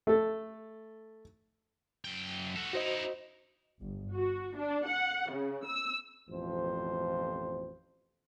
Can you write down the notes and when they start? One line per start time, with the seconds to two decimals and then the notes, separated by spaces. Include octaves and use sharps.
0.07 A3 A4
2.04 F#2 G5
2.56 F#4 A4
2.73 D#4 E4 F#4 C5 D#5
3.81 G1
4.14 F#4
4.57 D4
4.87 F#5
5.32 C#3
5.65 E6
6.29 A1 F2 B2 F3 C5